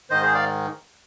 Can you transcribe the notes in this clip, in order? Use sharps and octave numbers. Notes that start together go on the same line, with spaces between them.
G#2 D#3 C5 D#5
G#4 C5
D5 F5